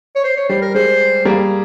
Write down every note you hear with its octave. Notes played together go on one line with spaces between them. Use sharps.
C#5
C5
C#5
G3 C5
A#4
G#3 C5
G3 A#3 G#4